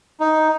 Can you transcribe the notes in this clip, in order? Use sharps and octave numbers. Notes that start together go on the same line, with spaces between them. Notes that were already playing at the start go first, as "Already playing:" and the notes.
D#4